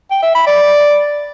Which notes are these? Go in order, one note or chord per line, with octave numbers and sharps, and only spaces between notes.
G5
E5
B5
D5